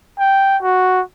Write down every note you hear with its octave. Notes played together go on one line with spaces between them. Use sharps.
G5
F#4